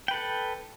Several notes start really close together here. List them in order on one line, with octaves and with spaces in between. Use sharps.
G5 B4 A4